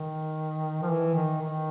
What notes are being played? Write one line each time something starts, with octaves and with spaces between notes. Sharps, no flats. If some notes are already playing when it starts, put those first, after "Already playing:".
Already playing: D#3
F3
E3
D#3
D#3